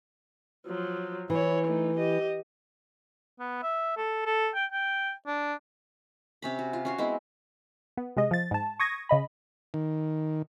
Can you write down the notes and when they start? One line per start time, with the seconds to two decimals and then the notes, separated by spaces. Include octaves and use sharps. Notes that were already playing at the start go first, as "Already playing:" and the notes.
0.66 F3 F#3
1.30 E3 E4 C#5
1.67 A3 D#4
1.96 G4 D#5
3.39 B3
3.63 E5
3.97 A4
4.25 A4
4.55 G5
4.72 G5
5.27 D4
6.42 C3 C#4 B5
6.59 F#4
6.73 F4
6.85 C#4 F#4 C6
6.98 G#3 B3 C4 E4
7.97 B3
8.17 C3 G#3 D#5
8.31 F3 A6
8.51 G#2 A5
8.80 C#6 D#6 G#6 A#6
9.09 C#3 D#5 B5
9.74 D#3